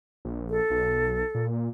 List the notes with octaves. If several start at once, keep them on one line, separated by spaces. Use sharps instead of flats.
A#1
A4
B1
A#2